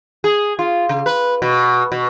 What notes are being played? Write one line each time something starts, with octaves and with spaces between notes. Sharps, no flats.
G#4
F4
C#3
B4
B2
B2